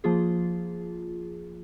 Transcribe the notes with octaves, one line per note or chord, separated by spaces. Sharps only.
F3 A#3 F4 G#4